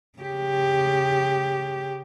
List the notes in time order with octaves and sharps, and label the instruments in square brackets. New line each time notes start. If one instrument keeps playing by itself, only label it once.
[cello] C#3 G4